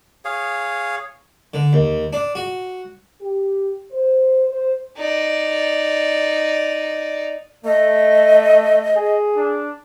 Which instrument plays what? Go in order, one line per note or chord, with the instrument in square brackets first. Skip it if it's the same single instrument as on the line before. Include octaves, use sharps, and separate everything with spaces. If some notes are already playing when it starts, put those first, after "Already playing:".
[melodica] G#4 C#5 F5
[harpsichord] D3
D#2
D4
F#4
[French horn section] G4
C5
C5
[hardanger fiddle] D#4 D5
[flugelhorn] A3 [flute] D#5
[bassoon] G#4
[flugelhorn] D4